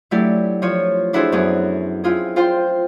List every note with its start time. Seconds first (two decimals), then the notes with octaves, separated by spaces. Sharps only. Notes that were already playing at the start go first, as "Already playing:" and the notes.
0.11 F#3 A3 D4 E4 G4 D5
0.62 F3 F4 C#5
1.13 D4 E4 F#4 G#4 A4 C5
1.32 F#2 B3 C#4 G#4
2.04 C4 E4 F4 G#4
2.36 F4 C5 G5 C6